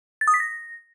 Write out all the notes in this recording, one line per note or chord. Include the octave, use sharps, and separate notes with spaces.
A6
D#6
B6
A#6